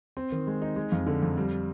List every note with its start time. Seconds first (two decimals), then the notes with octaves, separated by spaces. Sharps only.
0.17 C4
0.32 D#3
0.47 G#3
0.62 D#4
0.76 G#3
0.92 F2
1.07 D3
1.22 F2
1.37 G3